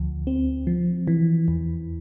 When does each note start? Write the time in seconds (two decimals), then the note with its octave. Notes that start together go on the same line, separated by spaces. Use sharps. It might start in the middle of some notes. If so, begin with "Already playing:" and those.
Already playing: D2 F3
0.27 C4
0.67 F3
1.07 E3
1.48 E2